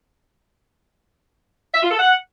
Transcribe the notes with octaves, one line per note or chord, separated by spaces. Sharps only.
E5
F4
A4
F#5